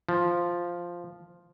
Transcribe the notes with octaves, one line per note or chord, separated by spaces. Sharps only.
F3